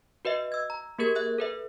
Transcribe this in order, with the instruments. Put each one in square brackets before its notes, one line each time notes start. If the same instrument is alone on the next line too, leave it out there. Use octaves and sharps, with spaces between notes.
[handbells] F#4 B4 D#5 E5
E6 G#6
A#5
A#3 G4 G#4 A#4 G#6
E5 F#6 G#6
A4 B4 E5